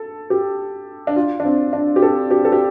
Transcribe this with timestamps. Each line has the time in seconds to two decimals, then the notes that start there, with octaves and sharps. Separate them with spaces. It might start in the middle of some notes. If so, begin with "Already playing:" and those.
Already playing: A4
0.30 G4
1.07 D4
1.16 F4
1.40 D4
1.45 C4
1.73 D4
1.96 G4
2.02 A4
2.31 G4
2.45 A4
2.52 G4